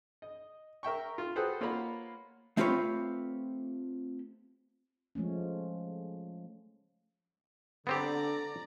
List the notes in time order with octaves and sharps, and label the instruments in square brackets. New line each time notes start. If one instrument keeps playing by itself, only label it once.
[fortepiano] D#5
A#4 E5 G5 C#6
F4
F#4 G#4 A4 B4 C5 G5
A#3 F4 C#5 F5 F#5 B5
[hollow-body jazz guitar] A3 C4 F4 G4 B4 C#5
[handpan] F3 G#3 A3 C#4
[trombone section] D3 [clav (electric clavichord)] B3 C4 G4 [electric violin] D5 A#5